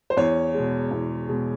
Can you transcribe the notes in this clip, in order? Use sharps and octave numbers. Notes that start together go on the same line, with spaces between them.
C5
E2 C#5
B2 G#3
E2
B2 G#3